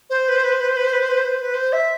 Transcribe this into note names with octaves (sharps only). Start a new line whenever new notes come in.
C5
B4
C5
B4
C5
B4
C5
B4
C5
B4
C5
B4
C5
B4
C5
B4
C5
E5